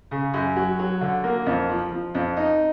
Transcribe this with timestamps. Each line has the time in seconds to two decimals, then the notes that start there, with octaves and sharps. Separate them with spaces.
0.11 C#3
0.34 F#2
0.56 F#3
0.79 F#3
1.01 D3
1.24 A#3
1.46 F2
1.69 F3
1.92 F3
2.15 F2
2.37 D#4